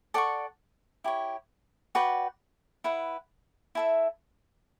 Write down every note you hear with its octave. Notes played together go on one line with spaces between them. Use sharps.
A4 D5 F#5 C#6
E4 G4 C#5
F#4 B4 D5 G5
E4 B4 F#5
E4 A4 E5